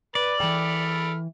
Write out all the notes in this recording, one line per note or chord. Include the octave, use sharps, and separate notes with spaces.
B4 D5
E3 A4 G5 B5 F6